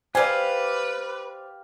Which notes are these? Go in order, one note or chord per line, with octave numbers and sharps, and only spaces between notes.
G4 B4 C5 D5 F5 G#5